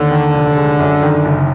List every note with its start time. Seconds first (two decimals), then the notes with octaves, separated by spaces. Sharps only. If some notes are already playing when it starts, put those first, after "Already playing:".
Already playing: D#2 D3
0.11 D#3
0.34 F1
0.57 G#3
0.79 F#2
1.03 D#3
1.25 F#1